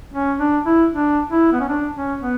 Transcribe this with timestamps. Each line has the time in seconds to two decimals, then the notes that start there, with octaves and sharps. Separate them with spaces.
0.14 C#4
0.40 D4
0.66 E4
0.92 D4
1.30 E4
1.52 B3
1.60 C#4
1.69 D4
1.95 C#4
2.21 B3